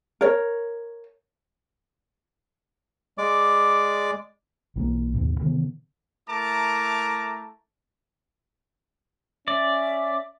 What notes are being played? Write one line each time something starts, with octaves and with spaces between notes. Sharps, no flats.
A#4 C#5
G#3 D5 D6
B1 E3 F#3 A#3
D#2 G#2 B2
C3 D#3 E3 B3
A3 E4 A#4 A5 A#5 D6
C#4 D5 E5